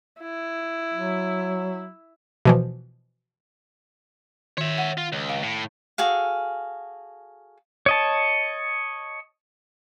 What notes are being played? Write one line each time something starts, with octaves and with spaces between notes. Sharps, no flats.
E4
F#3
B2 E3 F3
D#3 C#5 E5
F#5
F4
C#2
F5
A2
F#4 G#4 A4 F5
C#5 D#5 A5